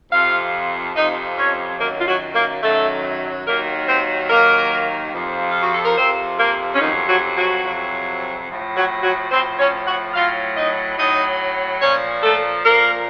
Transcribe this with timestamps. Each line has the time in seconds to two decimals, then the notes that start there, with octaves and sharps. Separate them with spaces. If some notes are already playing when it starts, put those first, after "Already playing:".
0.12 F2 C3 F3 F4 F5
0.95 F2 C3 F3 D#4 D#5
1.37 C#4 C#5
1.79 F#2 D#3 F#3 A#3 A#4
2.00 F4
2.07 F#3 F#4
2.35 A#3 A#4
2.62 F#2 D#3 F#3 A3 A4
3.46 D#2 D#3 F#3 A#3 A#4
3.87 C4 C5
4.29 D#2 D#3 F#3 A#3 A#4
5.13 F2 C3 F3
5.50 F4
5.62 F#4
5.74 A4
5.85 A#4
5.96 F2 C3 F3 C4 C5
6.38 A#3 A#4
6.74 C#4
6.80 F2 C3 D#3 F#3 D#4
7.07 F#3 F#4
7.36 F#3 F#4
7.64 F2 C3 F#3
8.47 A2 F3
8.75 F#3 F#4
9.02 F#3 F#4
9.31 A2 F3 C4 C5
9.59 C#4 C#5
9.86 F#4 F#5
10.14 A2 F#3 F4 F5
10.56 D#4 D#5
10.98 A2 F#3 D#4 D#5
11.81 A#2 F3 C#4 C#5
12.23 A3 A4
12.64 A#2 F3 A#3 A#4